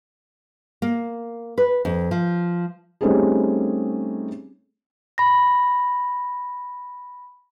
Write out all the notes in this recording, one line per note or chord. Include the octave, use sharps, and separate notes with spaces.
A#3
B4
F2
F3
G3 A3 C4 C#4 D#4 G#4
B5 A#6